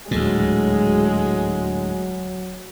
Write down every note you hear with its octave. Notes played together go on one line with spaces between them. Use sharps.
D#1 D2 A2 F#3 G#3 A#3